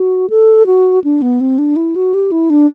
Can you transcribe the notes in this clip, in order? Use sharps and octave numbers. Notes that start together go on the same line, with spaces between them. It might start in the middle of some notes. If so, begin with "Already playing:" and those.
Already playing: F#4
A4
F#4
D4
B3
C4
D4
E4
F#4
G4
E4
D4